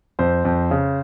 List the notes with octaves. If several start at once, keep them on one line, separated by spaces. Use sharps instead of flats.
F2 C5
F2
C#3